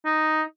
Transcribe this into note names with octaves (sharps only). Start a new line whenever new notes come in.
D#4